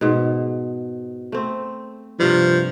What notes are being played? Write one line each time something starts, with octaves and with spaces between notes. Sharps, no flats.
G#2 B2
A3 C4
G2 C3 F3